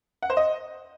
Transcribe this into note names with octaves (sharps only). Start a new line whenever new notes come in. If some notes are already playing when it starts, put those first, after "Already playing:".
F#5
C5
D#5